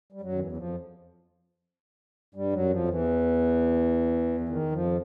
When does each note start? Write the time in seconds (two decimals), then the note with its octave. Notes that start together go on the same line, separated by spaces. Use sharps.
0.12 G3
0.21 F#2 F#3
0.33 D#3
0.39 E2 E3
0.52 E3
0.57 F2 F3
2.35 G2 G3
2.53 F#2 F#3
2.70 F2 F3
2.88 E2 E3
4.40 E3
4.49 D#3
4.72 F2 F3